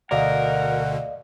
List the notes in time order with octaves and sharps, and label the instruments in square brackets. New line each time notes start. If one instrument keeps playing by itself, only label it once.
[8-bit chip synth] D2 B2 D3 [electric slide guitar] A#4 [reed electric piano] D5 D#5 F5 [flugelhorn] F#5